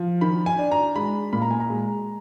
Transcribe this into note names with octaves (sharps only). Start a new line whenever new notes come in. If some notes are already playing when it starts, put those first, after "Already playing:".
Already playing: F3
D#3 B5
G#5
D4
A#5
G#3 B5
A#2 B5
A#5
G#5
A#5
G#3